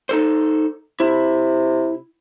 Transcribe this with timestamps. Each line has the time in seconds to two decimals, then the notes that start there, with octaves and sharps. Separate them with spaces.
0.09 D#4 A4 C5
1.00 C3 E4